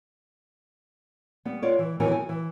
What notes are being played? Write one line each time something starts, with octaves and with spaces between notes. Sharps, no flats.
G3 B3
F4 C#5 D5
E3
D#3 E3 F#3 B3 A#4 G#5
G#5
E3